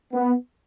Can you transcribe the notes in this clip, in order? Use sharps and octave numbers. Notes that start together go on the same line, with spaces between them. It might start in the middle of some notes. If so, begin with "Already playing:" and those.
B3